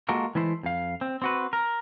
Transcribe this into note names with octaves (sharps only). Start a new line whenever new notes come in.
G#3 A#3 F4 F#4 A4 A#4
E3 G#3 A3 E4 C5
F2 F5
C4
C4 F#4 B4
A#4